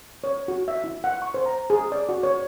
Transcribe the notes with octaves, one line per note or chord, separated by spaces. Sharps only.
C#5
F#4
E5
E4
F#5
C#6
C5
A#5
G#4
D5
F#4
C#5